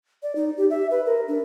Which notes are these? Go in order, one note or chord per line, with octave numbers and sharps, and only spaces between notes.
D5
D#4
G4
E5
B4
A#4
D4